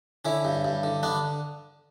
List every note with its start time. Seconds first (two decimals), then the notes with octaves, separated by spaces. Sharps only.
0.25 D3 C#4 E4
0.45 G2
0.65 G2
0.83 D3
1.03 D3 B3 D4